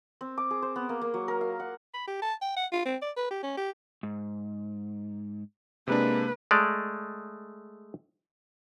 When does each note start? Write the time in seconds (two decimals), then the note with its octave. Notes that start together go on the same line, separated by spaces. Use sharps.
0.21 C4
0.38 D6
0.51 G#4
0.62 C5
0.76 B3
0.89 A#3
1.01 A#3
1.14 F#3
1.28 A#4
1.41 F5
1.60 F#5
1.94 B5
2.08 G4
2.22 A5
2.42 G5
2.57 F#5
2.73 F4
2.86 C4
3.02 D5
3.17 B4
3.31 G4
3.43 C#4
3.58 G4
4.03 G#2
5.88 C3 G#3 A#3 D4 B4
6.51 G#3 A3 D5